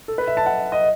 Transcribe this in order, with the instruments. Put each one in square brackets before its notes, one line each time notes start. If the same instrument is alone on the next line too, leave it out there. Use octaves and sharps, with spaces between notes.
[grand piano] A4
B4
E5
A5
F#5
D#5